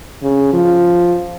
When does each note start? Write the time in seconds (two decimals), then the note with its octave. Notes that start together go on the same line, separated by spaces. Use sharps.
0.22 C#3
0.53 F3